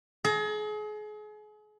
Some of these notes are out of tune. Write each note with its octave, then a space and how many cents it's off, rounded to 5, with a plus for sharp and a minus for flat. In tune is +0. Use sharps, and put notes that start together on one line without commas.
G#4 +35 A#5 +0